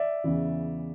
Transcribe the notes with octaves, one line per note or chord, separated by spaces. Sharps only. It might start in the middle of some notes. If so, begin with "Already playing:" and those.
Already playing: D5 E5
E2 C#3 E3